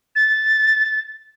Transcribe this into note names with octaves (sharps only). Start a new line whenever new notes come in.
A6